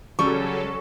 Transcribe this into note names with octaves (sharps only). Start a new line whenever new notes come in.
C#3 F#3 G3 C#4 A4 C#6